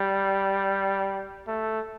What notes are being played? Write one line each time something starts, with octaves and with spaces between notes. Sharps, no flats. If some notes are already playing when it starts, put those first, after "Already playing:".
Already playing: G3
A3